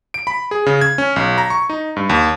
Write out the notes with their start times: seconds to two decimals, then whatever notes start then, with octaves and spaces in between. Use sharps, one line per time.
0.14 D7
0.27 B5
0.51 G#4
0.66 C#3
0.81 G#6
0.98 C#4
1.16 B1
1.38 A#5
1.50 C#6
1.70 D#4
1.96 G2
2.09 D#2